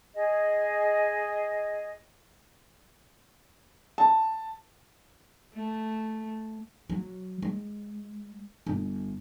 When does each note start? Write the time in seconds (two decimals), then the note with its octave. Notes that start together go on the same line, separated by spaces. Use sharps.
0.15 G#4 D#5
3.98 A5
5.53 A3
6.90 F#3
7.42 G#3
8.66 G1